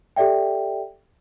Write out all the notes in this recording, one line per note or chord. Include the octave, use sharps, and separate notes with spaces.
G4 A4 D5 E5 G5